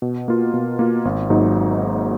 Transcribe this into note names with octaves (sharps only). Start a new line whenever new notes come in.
B2
A#3 F4
B2
A#3 F4
G#1
G#2 F#3 A#3 D#4